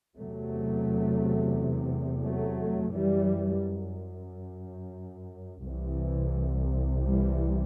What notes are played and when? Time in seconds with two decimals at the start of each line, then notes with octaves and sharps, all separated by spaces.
0.17 E2 C3 F#3 A3
2.23 F#3 A3
2.92 F#2 E3 G3
5.65 C2 C3 E3
7.02 E3 G3